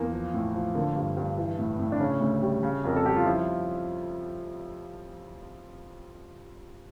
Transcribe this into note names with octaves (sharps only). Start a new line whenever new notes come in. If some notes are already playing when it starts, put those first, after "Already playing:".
Already playing: E2 A#3
F3
A2
F3
D3 A#3
G2
G2
E3
A2
A2
D4
C#3 C#4
D2
G3
C#3
F2 A#4
A4
G3 G4
F4
F3 E4